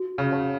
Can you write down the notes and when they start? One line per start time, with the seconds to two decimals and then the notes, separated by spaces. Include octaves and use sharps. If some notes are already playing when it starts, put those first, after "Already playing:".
Already playing: F#4
0.18 C#3
0.32 C#5 F#5 A5 C#6